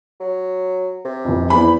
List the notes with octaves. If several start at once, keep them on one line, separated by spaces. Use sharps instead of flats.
F#3
C3
F1 F2
E2 G#2 E3 B5